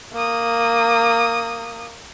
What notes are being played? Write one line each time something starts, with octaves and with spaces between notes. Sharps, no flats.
A#3 D#6